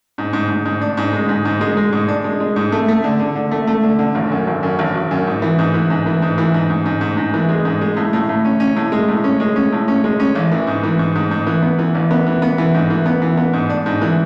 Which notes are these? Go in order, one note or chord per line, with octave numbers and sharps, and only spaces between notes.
G#2
G#2
G#2
G#2
D4
G#2
G#3
G#2
G#2
G#3
G#3
G#2
D4
G#3
G#3
G#2
A3
A3
D3
D3
D3
A3
A3
D3
D3
G#1
F#2
G#1
F#2
G#1
G#1
F#2
G#2
E3
G#2
E3
G#2
E3
G#2
E3
G#2
G#2
G#2
G#2
G#2
E3
G#3
G#2
G#3
A2
A2
A2
C#4
C#4
A2
G#3
A2
C#4
G#3
C#4
A2
C#4
G#3
C#4
A1
E3
G#2
E3
G#2
G#2
G#2
E3
B3
E3
A1
B3
E3
B3
E3
G#2
E3
B3
E3
B3
G#2
D4
G#2
E3